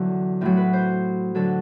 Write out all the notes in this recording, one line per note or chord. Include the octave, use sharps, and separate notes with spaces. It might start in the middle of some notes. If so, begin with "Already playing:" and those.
Already playing: E2 D3 F#3
A2 F#3 C4
B4
C5
D3 F#3 A4